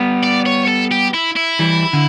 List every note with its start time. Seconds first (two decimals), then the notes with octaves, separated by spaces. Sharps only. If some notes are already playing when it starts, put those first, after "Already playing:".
Already playing: G3 B3
0.23 D5
0.46 C#5
0.68 A4
0.92 G4
1.14 E4
1.36 E4
1.59 E3 G3
1.93 D3